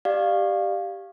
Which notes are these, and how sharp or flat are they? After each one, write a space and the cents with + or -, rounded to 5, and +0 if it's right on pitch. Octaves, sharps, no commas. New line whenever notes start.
G4 +0 D5 +25 F5 +0